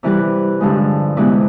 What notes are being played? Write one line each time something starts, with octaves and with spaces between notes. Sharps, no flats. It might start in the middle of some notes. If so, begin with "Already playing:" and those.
C3 E3 G3 B4
G2 D3 F3 G#3
C3 E3 G#3 B3 B4